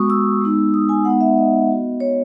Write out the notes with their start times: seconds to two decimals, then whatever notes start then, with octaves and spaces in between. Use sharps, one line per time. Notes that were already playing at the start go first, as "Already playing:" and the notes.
Already playing: G#3 B3 F#4 C#6 D#6
0.10 E6
0.41 G#3 B3 D#4
0.74 D#6
0.89 G#5
1.05 G#3 B3 D#4 F#5
1.21 E5
1.38 D#5
1.69 B3 F#4
2.00 C#5